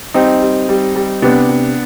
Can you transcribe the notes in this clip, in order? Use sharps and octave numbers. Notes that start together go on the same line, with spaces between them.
G3 C4 D#4
G3
G3
G3
C3 B3 D4
C3